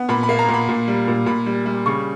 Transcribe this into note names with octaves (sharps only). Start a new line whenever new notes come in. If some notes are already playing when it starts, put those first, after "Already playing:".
Already playing: B3
A#2 B5
B5
A#3
A#5
A#2
B5
A#2
G3
A#2
A#2 B5
G3
G3
C#3 C#6